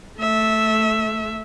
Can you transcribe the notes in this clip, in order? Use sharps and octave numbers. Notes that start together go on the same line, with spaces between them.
A3 E5